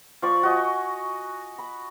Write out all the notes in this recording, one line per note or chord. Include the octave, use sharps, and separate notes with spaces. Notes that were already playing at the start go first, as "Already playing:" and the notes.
F3 D5 C#6 D6
F#4 D#5 G#5
B5